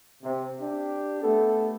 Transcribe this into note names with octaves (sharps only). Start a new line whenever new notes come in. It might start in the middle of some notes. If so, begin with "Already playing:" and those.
C3
D4 G4
A3 B3 A4